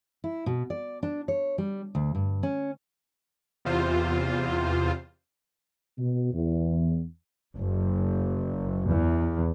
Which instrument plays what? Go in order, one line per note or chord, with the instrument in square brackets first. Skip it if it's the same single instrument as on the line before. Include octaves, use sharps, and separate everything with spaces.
[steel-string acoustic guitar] E4
B2
D5
D4
C#5
G3
D2
G2
C#4
[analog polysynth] E2 C3 F4 C5
[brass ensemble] B2
E2
[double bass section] F#1
E2